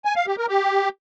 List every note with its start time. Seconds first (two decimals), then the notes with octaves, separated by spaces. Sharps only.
0.05 G#5
0.16 F5
0.27 G4
0.37 A#4
0.48 G4